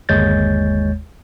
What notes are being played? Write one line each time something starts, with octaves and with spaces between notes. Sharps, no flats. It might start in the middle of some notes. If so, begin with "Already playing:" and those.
G1 D#2 G#3 C#5 G6 A6